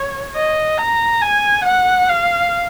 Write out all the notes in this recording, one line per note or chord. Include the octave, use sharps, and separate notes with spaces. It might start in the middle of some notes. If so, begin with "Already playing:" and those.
Already playing: C#5
D#5
A#5
G#5
F#5
F5